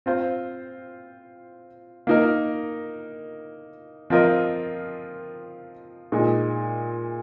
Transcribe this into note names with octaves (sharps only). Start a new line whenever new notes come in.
C4 F4 C5
A#3 D#4 A#4
F3 C4 F4 A#4 D#5
A#2 G#3 D#4